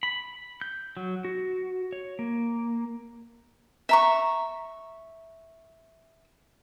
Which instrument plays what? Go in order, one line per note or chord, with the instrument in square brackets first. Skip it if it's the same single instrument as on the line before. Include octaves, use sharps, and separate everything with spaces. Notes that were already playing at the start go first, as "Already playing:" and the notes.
[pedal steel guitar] B5
G6
F#3
F#4
C#5
A#3
[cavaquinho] E5 A#5 C#6